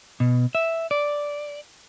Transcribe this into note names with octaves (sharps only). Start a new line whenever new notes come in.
B2
E5
D5